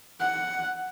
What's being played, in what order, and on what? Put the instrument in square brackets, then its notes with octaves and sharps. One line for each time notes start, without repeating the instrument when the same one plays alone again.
[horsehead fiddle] F#5